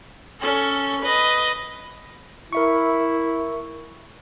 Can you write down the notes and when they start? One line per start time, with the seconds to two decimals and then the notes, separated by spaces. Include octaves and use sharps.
0.40 C#4 A4
1.02 B4 D#5
2.53 E4 A#4 E5 C#6